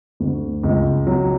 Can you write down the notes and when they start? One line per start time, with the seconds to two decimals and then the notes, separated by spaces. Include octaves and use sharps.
0.20 D2
0.64 C#2
1.07 F#3